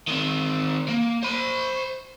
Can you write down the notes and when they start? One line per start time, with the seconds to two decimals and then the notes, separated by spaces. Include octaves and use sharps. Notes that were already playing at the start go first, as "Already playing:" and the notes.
0.08 D#3 C4
0.88 A#3
1.22 C5 B5